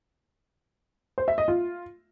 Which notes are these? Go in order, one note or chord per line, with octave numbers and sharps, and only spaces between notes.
C5
E5
D#5
F4